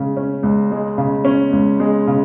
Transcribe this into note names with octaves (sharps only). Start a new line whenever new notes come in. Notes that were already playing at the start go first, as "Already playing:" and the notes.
Already playing: C#3 G#3
C#4
C#2
G#3
C#3
C#4
C#2
G#3
C#3